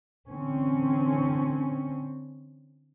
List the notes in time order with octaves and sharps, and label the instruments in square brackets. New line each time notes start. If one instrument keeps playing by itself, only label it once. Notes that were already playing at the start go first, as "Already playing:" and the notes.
[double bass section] D3 E3 C4 C#4